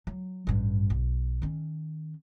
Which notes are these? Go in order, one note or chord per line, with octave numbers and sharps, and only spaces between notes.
F#3
A1 G2
B1
D#3 C#4